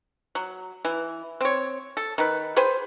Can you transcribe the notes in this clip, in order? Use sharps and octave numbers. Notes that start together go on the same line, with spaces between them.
F#3
E3
C4 C#5
A4
D#3 B4
G#4 B4 C5 G5